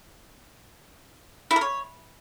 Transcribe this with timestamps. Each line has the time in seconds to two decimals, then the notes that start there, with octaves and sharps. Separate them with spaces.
1.51 E4
1.56 A#4
1.61 C#5